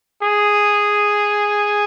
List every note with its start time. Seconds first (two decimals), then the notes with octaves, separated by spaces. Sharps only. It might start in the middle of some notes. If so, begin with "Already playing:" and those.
0.22 G#4